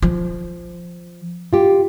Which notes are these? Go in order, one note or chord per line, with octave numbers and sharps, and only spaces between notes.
F3
F4 G4